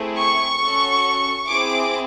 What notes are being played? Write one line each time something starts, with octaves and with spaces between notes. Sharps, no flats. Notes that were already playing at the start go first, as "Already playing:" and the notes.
Already playing: A3 C4 E4 G#4
C#6
C#4 F#4 A4
C4 E4 G#4 D6